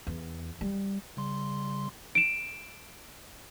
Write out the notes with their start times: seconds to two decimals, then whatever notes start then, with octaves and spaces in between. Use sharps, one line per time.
0.07 E2
0.61 G3
1.17 C#3 G3 C6
2.15 D7 E7